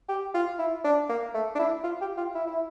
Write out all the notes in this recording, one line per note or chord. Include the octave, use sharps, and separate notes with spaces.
G4
F4
E4
D4
A#3
A3
D4
E4
F4
G4
F4
E4
E4